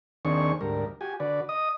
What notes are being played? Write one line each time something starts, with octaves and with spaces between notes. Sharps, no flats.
D#2 D#3 C4 D4 G#4 C#6
D2 G#2 G3 A#4
F#4 G4 G#5
D3 F#4 B4 D5
D#5 D#6